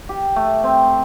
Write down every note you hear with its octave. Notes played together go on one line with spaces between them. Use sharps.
G4
A3
C4